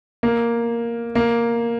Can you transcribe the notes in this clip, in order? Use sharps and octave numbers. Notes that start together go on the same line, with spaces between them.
A#3
A#3